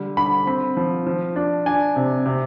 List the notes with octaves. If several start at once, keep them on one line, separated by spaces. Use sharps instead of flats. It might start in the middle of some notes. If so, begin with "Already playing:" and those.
Already playing: D3 G3
D3 B5
C4 B5
F3
F3
D4
D4 G#5
C3
C3